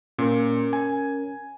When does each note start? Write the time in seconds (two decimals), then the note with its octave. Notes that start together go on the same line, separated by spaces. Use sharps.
0.19 A#2 C#4 A#4
0.73 G#5